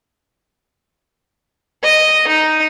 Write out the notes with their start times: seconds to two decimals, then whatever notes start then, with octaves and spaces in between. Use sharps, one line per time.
1.84 D#5
2.28 D#4